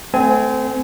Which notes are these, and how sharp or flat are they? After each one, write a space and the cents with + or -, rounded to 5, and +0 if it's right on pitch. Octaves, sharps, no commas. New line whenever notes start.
A3 +0 C4 -25 G#5 +10